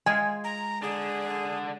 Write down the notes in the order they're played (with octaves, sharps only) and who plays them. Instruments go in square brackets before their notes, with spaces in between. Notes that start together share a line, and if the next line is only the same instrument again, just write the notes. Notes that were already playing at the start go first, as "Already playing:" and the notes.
[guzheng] G#3 F4 [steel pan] G#5
[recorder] A#5
[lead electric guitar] D3 D4 [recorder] G#4